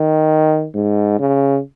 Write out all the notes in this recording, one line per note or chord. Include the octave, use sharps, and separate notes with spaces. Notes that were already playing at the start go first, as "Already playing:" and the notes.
Already playing: D#3
G#2
C#3